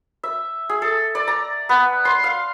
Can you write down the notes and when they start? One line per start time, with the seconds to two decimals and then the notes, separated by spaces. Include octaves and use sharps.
0.23 E5
0.69 G#4
0.82 A4
1.15 D5
1.28 A#5
1.69 B3
2.05 C6
2.24 F5